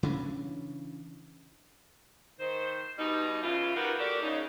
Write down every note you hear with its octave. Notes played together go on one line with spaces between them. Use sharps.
C#3 E3 C#4 D4
D#3 C5
G2 B2 G3 D#4
C#3 E3 F4
B3 D#4 F#4 G4 A#4 B4
A#3 F#4 G4 A4 A#4 D5
C#3 D#4